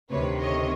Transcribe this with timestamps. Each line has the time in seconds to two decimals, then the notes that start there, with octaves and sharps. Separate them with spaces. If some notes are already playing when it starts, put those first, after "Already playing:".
0.10 D2 C3 D#3 B4 C#5
0.40 C#5 D#5